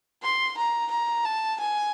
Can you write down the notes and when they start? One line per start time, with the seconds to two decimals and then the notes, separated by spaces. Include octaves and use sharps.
0.23 C6
0.57 A#5
0.91 A#5
1.25 A5
1.60 G#5